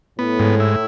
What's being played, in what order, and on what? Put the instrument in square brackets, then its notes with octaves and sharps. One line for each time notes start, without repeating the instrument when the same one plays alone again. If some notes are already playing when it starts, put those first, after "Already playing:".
[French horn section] A2 [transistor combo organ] B3
[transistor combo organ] G#2
E4